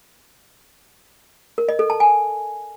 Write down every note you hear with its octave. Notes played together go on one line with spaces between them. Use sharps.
A#4
D#5
A4
A5
G#5